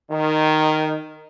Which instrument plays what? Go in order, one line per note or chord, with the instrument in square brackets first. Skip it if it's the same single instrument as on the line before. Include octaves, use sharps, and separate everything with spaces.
[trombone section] D#3